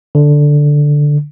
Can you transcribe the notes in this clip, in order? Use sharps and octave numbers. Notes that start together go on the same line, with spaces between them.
D3